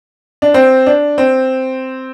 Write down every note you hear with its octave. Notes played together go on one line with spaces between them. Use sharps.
D4
C4
D4
C4